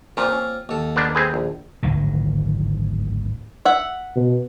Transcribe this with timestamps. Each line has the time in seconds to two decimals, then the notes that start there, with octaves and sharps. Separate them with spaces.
0.17 A#2 A#3 C4 F4
0.33 C#4
0.69 D#2 A4
0.96 A#3 B3 D4
1.15 C4 G#4 B4
1.34 A#1
1.83 D1 G#1 D2 D#3
3.65 E5 F#5
4.16 B2